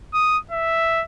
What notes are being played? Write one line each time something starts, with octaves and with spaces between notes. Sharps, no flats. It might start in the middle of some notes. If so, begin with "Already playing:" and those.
D#6
E5